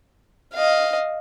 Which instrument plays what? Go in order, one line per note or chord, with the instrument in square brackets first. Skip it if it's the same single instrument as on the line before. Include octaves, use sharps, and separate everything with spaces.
[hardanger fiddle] D#5 F5